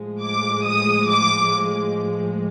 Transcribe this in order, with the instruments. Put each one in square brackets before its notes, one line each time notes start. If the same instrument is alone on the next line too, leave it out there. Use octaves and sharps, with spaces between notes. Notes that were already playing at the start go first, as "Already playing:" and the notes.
Already playing: [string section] A2 F3 G#3
D6
D#6
D6